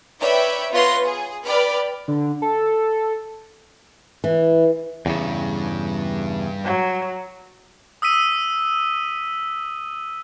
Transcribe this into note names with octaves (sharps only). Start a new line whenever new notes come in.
B4 C#5 D5 E5 G5 B5
B3 F4 B4 C#5 C6 A#6
G#4
B4 D5 G5 B5 F6
D3
A4
E3
E2 G2 C#3
F#3
D#6 E6 B6 D#7